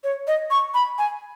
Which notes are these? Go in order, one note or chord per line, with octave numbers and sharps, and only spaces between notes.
C#5
D#5
C#6
B5
G#5